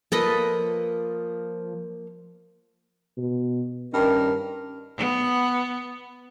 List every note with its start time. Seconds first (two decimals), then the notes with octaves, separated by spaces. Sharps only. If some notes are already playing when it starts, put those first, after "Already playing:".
0.12 F3 A#3 A4 B4 D#5
3.17 B2
3.93 G2 D#3 C#4 A#4
4.97 B3